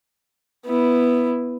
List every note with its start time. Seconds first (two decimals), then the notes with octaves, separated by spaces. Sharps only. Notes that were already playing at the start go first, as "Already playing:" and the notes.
0.65 B3 E4